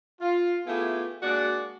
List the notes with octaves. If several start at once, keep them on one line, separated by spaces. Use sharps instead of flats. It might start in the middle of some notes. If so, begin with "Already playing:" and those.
F4
A3 B3 E4 F4 G4 G#4
G#3 A#3 D4 F#4 D5